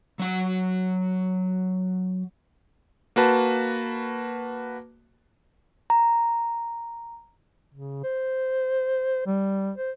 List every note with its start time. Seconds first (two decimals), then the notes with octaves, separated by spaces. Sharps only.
0.19 F#3 F#5
3.16 A#3 F#4 B4 A5
5.90 A#5
7.74 C#3
8.04 C5
9.27 G3
9.78 C5